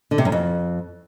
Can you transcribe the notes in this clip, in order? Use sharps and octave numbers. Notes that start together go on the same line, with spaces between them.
D3
C3
F#2
F2